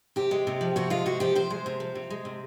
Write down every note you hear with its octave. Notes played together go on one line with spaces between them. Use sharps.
C3 G4
G#3
C3
F3
C3 F#4
G#3 F4
C3 F#4
F3 G4
C3 C5
G#3
C3
F3
C3
G#3
C3